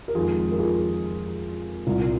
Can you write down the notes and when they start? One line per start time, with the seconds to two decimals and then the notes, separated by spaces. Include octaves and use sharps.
0.08 A#4
0.15 F2 D#3 G#3 F4 G#4
0.51 A#4
0.58 F4 G#4
1.86 C2 A#2 G3